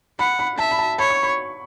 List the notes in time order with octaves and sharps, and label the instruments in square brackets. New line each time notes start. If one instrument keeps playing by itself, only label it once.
[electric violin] F#5 [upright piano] B5
[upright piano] B5
[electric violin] E5 [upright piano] A5
[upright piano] B5
A5
[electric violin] C#5 [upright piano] B5
[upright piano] C#6
B5